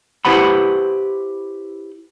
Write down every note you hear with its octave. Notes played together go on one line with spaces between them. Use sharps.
E4 G4 B4 C5 F#5 B5